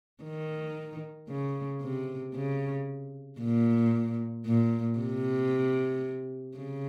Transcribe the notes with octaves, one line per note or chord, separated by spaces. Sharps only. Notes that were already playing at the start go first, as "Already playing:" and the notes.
D#3
C#3
C3
C#3
A#2
A#2
C3
C#3